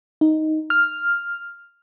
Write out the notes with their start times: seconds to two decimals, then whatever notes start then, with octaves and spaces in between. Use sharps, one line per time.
0.21 D#4
0.70 F6